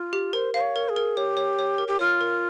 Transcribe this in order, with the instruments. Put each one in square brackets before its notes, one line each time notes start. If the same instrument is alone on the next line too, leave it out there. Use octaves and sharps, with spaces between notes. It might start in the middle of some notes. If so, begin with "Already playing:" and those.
Already playing: [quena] F4
[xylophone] G4
[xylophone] A#4 [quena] C5
[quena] C5 [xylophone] F5
[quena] C#5
[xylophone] A#4
[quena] G#4
[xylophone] A#4
[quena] G4 [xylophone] C#5
[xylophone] C#5
C#5
A#4
[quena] G4
[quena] F4 [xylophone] C#5
[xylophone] A#4